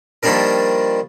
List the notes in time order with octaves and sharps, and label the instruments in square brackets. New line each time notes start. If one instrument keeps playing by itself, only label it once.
[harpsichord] D#3 F3 G3 A#3 D4 A#4